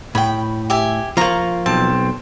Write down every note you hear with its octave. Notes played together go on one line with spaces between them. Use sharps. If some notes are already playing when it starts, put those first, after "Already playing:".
A2 G5 B5
G4 E5 G#5
F3 A#3 F4 A#5 C#6
B1 C4 A5